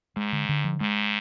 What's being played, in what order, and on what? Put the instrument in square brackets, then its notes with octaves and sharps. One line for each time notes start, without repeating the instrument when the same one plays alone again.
[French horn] G#2 [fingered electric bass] G#3
[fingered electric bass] D3
D3
F3
[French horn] G#2 [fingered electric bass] G#3